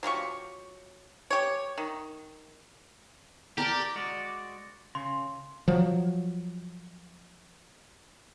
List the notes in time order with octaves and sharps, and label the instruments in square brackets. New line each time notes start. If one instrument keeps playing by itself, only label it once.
[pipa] F#3 F4 G4 C#6
G4 C#5
D#3
[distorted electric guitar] G4 [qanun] A#4 D5 A5
[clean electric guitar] G#3 F#4 D5
[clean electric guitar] C#3 [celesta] C6
[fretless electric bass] F3 F#3